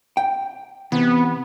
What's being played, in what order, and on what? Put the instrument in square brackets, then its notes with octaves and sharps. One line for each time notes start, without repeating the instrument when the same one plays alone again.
[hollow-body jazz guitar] G5
[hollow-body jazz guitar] C3 E3 [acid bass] B3